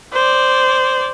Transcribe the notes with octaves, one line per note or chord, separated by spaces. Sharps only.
C5 D5